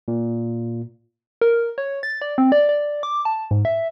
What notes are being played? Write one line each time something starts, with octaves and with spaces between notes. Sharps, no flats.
A#2
A#4
C#5
A6
D5
C4
D5
D5
D6
A5
G#2
E5